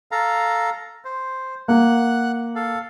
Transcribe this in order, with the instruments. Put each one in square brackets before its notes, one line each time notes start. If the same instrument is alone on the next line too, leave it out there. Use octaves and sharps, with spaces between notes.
[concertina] A4 F5 A#5
C5
[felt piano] A#3 [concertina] F#5 F#6
[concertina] A4 F5